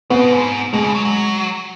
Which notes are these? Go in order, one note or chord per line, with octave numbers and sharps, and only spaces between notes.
C#3 B3
B2
G#2
B2 G#3
C#3
F#3
F#3